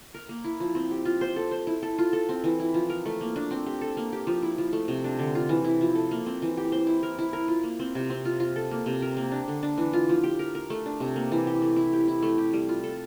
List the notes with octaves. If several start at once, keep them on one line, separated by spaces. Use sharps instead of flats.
A#4
A#3
E4
F3
C4
G4
F4
C5
A4
C5
E4
A4
F4
A4
C4
E3
E4
F3
A#4
A3
A#3
D4
C4
G4
A4
A#3
G4
F3
E4
F3
A3
C3
D4
D3
F4
E3
E4
F3
A4
A#3
C4
E3
G4
C5
E4
A#4
E4
A#4
F4
A#3
C4
C3
C4
F4
F4
A4
A#3
C3
A#4
A#3
D4
D3
D4
E3
F4
F3
G4
A#4
A#4
A3
D4
C3
A#3
E3
G4
A3
E4
G4
E4
A3
G4
G3
F4
A4